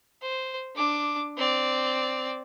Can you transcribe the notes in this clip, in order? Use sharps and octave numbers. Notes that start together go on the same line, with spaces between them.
C5
D4 D6
C4 D5